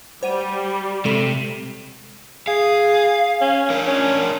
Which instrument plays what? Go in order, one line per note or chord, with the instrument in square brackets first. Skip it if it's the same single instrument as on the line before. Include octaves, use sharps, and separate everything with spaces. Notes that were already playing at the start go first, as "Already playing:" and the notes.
[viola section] G3 [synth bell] C5 F#5 D#7
[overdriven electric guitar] C3 [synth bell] G#3 A4 E7
[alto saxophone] G#4 [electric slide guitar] F5
[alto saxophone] C#4
[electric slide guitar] D4 A#4
[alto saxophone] C#4